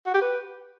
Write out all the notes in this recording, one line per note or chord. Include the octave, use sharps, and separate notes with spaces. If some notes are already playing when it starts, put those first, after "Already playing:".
F#4
G4
B4